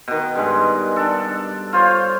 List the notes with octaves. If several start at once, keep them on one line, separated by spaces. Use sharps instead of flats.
B2 D#3
G2 G#3
D4 A4
F4 C5 C#5 F5